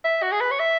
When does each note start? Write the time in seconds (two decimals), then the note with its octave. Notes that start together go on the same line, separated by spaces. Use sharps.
0.04 E5
0.22 F#4
0.32 G#4
0.40 B4
0.51 C#5
0.59 E5